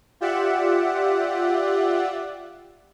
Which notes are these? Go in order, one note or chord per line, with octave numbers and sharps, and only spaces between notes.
F4 G4 D5 E5 F#5